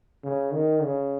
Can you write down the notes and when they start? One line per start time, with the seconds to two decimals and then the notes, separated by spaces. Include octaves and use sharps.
0.24 C#3
0.53 D#3
0.83 C#3